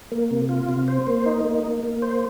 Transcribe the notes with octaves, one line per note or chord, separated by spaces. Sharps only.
A#3
C3
F4
C3
C5
A#3
D#4
A#3
A#3
A#3
C5